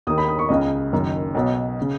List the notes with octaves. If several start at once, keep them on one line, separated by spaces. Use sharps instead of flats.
D#2 D#3 D#6
B5
D#6
C#6
C#2 C#3 D#5
F#1 F#2 D#3
B1 B2 C#5
C#3